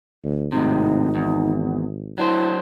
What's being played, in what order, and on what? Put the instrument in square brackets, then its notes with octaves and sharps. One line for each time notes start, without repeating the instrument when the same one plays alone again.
[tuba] D2
[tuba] G#1 [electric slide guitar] A2 C3 [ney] D#4
[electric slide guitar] E2
[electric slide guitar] F#3 D4 C5 [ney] E4